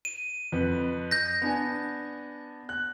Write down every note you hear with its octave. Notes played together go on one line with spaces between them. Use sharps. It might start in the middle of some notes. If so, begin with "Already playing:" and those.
D#7
F2 B4
G6 A#6
B3 D4 G#5
F#6